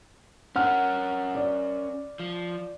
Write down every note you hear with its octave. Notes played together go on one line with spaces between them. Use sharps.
C#4 A#4 F#5 F6
D5
F3